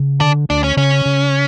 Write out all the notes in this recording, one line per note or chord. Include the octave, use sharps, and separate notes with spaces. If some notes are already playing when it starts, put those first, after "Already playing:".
Already playing: C#3
D3 D4
D2 D4
C#4
C#3 C#4
C#3